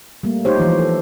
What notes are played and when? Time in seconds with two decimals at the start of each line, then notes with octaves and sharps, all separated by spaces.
0.23 G3 A3 A#3
0.45 D#4 G4 C5 C#5
0.58 E3 F3 F4
0.79 A4